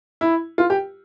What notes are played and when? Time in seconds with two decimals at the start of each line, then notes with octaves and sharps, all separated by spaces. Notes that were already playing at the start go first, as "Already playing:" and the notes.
0.21 E4
0.58 F4
0.70 G4